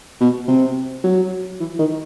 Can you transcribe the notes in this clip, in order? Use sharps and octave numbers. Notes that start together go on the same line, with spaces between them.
B2
C3
F#3
E3
D#3